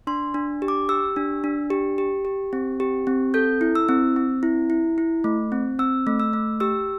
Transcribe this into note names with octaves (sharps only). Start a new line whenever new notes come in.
D4 C6
D4
G4
D6
G4 E6
D4
D4
G4
G4
G4
C4
G4
C4
A4 G6
E4
E6
C4
C4
E4
E4
E4
A3
C4
C4 E6
A3
E6
A3
G4 E6